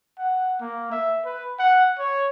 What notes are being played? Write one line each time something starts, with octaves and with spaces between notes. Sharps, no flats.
F#5
A#3
E5
B4
F#5
C#5